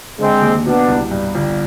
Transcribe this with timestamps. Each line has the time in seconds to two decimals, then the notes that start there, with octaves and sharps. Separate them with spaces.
0.19 D3 G#3 C4
0.42 D#2
0.66 B2 B3 D4
0.88 C2
1.11 G2
1.35 G1